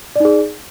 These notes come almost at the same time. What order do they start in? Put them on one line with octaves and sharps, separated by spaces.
D5 D#4 G#4